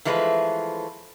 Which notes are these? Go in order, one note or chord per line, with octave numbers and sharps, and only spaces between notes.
E3 F3 G#3 A3 B4